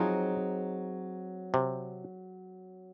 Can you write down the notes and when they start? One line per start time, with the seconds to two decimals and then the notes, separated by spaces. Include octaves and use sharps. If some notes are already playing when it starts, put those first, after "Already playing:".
Already playing: F3 F#3 C4 D#4 G#4
1.54 C3